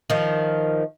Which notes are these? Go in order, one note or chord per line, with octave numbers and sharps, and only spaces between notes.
D#3 F3